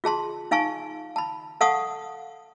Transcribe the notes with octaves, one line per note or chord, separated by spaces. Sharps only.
F4 G#4 A5 C6
D#4 F5 G#5 A5 C#6
A5 B5
A4 F5 F#5 A5 C#6 D#6